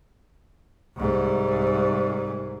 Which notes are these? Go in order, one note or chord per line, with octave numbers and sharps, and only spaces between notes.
C2 G#2